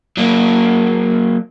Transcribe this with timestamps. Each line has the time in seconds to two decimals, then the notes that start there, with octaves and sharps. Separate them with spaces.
0.18 F#3 A#3